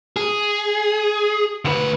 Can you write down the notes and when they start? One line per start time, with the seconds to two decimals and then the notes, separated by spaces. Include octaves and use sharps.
0.17 G#4
1.65 D2 B4